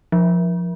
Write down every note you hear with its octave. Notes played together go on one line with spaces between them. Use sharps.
F3